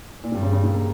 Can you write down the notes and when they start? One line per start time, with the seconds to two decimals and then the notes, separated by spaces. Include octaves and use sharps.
0.24 A#2
0.32 G2 C3
0.43 C#3
0.53 C#3
0.63 C3
0.74 A#3